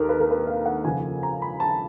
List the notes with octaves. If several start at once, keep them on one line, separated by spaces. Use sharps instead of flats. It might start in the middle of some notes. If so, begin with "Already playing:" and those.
Already playing: D#2 D#3 A4 A#4
B4
A#4
B4
F5
F#5
F2 C#3 F3 G#5
A#5
B5
A5